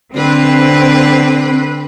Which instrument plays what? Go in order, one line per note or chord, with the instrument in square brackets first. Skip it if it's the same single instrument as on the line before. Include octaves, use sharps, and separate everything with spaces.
[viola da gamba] D3 B4 [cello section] C4